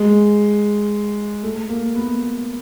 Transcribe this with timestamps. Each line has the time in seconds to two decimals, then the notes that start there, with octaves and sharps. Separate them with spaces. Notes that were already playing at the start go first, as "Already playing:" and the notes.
Already playing: G#3
1.43 A3
1.69 A#3
1.96 B3